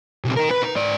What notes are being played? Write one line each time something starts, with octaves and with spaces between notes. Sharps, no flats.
B1 C3
D#4 A#4
B4 B5
D#4
G#2 D5